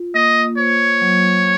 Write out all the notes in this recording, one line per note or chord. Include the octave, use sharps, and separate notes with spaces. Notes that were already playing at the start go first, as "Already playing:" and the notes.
Already playing: F4
A#3 D#5
C5 C#5
F#3